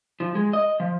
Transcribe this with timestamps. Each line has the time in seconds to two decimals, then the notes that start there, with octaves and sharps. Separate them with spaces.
0.20 F3
0.35 G#3
0.53 D#5
0.80 F3